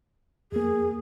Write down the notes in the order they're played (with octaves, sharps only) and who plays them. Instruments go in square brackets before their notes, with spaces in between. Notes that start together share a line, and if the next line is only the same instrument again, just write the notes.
[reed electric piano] F2 A#3 [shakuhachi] G#4